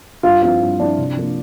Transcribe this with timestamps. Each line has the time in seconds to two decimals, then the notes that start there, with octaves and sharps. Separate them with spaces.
0.23 G2 F4 F5
0.42 F3 C4 E4 F4 F5
0.61 G2
0.79 F3 C4 D4 E4 D5
0.98 C3
1.17 F3 A#3 D4